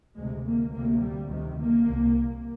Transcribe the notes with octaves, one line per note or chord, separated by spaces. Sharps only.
D2 G#3
C3
A#3
D2 C3 A#3
G3
D2 C3 D#3
A#3
C2 C3